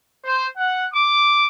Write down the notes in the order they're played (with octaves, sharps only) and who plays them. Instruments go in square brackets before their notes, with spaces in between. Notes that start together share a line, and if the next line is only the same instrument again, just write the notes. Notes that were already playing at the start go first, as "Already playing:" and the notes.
[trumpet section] C5
F#5
D6